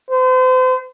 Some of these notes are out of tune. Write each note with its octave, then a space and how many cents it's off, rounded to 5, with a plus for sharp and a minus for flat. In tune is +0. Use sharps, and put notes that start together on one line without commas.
C5 -40